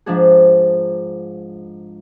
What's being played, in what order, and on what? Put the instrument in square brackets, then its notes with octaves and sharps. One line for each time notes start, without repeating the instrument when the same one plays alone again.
[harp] G#2 F3 D4 G#4